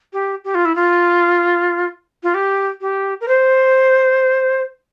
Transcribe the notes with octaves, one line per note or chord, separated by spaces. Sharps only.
G4
G4
F4
E4
F4
F4
G4
G4
A#4
C5